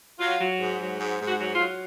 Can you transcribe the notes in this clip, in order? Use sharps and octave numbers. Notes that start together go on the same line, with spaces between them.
F#3 F4
F#3
G#2
F#3
G#2
G#2
F#4
F#3
F4
F#3